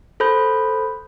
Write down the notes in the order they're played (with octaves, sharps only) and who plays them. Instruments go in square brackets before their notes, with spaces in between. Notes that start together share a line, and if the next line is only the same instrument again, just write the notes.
[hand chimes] A4 C5 B5 G6